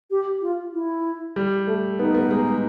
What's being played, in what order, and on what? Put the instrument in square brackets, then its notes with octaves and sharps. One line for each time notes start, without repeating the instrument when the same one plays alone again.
[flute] G4
F4
E4
[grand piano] G3
A3
[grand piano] B3 [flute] D#4
[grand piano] B3
G#3